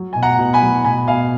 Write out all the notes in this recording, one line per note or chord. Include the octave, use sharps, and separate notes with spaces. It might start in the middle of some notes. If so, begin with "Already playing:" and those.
Already playing: F#3
B2 G#5
F#5 A#5
B2
G#5 B5
F#3
B2 G#5 B5
B2 F5 G#5